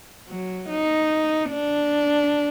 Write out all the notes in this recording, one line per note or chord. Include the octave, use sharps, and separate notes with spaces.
F#3
D#4
D4